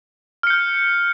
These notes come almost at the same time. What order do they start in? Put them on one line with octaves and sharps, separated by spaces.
F6 C#7 G6